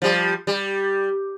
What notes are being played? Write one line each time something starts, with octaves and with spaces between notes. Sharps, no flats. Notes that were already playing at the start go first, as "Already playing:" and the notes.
F3 G3
G3